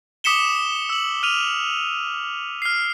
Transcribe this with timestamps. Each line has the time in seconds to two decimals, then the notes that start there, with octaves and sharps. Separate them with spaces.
0.24 D6 D#6 B6 C#7 E7 G7
0.90 E6 F#7
1.23 F6 D#7 F7
2.62 F6 C7